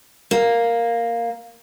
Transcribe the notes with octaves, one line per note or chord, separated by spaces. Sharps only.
A#3